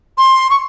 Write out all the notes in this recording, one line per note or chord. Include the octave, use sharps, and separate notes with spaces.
C6
C#6